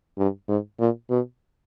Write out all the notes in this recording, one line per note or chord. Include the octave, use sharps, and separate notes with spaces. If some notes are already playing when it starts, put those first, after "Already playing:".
G2
G#2
A#2
B2